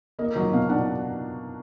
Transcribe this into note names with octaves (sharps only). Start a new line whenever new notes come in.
A#3 D#5
F#3 D#5
B2 F5
D4 F#5